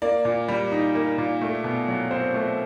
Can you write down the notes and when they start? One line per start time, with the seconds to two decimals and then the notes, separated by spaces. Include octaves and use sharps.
0.02 A#3 D5
0.25 A#2
0.48 G3
0.72 D#4
0.95 A#3
1.18 A#2
1.41 A3
1.64 B2
1.88 F#3
2.11 C4 C5
2.34 A3